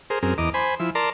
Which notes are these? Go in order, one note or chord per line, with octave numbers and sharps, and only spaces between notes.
G#4 A#4 C5
F#2 C4 G#4 A#4
E2 D#5 A#5 D6
C5 G#5 B5
F3 E4
A#4 D5 A5 A#5 C6